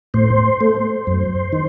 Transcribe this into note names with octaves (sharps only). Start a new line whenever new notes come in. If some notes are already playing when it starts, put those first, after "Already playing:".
A2 C5
A3
F#2
D#3